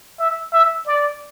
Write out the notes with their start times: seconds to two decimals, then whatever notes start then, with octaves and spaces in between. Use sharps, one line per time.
0.19 E5
0.53 E5
0.87 D5